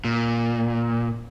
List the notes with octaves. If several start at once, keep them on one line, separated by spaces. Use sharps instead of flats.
A#2